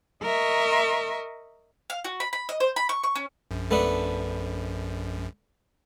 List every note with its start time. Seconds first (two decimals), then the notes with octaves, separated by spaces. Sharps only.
0.23 A#4 D#5 E5 C#6
1.90 F5
2.04 F#4
2.20 B5
2.33 B5
2.49 D#5
2.60 C5
2.76 B5
2.89 C#6
3.04 C#6
3.15 C#4
3.51 A#1 F#2
3.71 A3 B3 D4